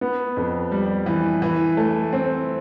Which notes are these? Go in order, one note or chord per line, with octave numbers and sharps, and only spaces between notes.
B3
F2
G3
E3
E3
A3
C4